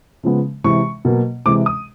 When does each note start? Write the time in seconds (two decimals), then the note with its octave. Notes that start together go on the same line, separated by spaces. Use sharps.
0.23 C#3 F3 G#3 B3
0.64 C3 E3 G#3 C#6
1.05 B2 F#3 A#3
1.46 C3 E3 G#3 D6
1.66 D#6